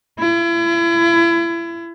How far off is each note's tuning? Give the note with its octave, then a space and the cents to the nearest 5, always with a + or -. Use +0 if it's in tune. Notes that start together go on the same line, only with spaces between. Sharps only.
E4 +35